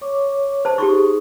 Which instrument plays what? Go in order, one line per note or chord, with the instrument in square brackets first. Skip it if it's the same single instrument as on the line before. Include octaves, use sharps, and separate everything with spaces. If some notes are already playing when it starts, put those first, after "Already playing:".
[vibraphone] C#5 C#6 D6
[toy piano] C5 A5
[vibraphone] D#4 G#4 D#6 [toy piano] G4 C6 C#6